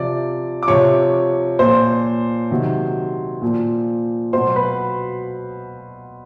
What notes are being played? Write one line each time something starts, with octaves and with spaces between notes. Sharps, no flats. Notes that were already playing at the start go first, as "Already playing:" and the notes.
Already playing: C3 F3 D5
D6
C3 F3 C#5 C#6
A#2 F3 C5 C6
C3 D#3 F#3
A#2 F3
B2 F#3 C5 C6
B4 B5